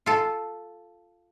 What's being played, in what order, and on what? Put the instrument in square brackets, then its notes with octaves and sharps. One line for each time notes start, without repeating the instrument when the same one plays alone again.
[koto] F4 A4